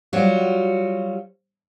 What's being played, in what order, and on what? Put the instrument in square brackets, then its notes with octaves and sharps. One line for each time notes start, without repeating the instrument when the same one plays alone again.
[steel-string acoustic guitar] F#3 G3 F4 F#4